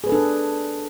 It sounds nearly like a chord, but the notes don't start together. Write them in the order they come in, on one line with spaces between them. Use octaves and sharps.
G#4 B4 A4 D4